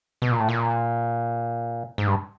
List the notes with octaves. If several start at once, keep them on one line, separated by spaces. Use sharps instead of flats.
B2
A#2
A2
A#2
G#2
G2